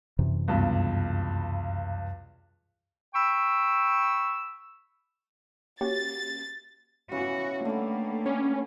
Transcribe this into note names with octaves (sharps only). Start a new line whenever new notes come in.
F#2 C3 E3
C#2 G2 B2
G5 B5 C#6 E6
A#3 C#4 F#4 G4 A6
C#3 E3 B3 F#4
D3 G3 A3 A#3
C#4 D5